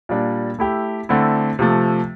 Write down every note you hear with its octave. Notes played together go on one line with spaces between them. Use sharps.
A#2 G3 D4
A3 E4 G4
D3 A3 C4 E4
C3 F3 A3